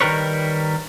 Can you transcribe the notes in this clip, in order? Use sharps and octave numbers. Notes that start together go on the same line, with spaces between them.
D#3 G3 A#4 B4 C#5